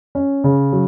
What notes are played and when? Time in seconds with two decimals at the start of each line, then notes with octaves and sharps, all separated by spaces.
0.15 C#4
0.44 C#3
0.73 F#3